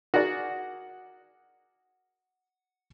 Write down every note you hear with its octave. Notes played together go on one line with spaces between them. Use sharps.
F#4 G#4 A#4 D5 F#5